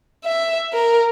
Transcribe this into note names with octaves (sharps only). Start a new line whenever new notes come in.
E5
A#4